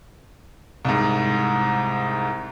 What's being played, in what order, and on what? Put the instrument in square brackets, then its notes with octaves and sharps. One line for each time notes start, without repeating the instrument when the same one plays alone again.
[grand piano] C2 G#2